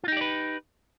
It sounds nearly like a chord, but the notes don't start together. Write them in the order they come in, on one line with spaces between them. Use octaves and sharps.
F4 D#4 G4 D5 B4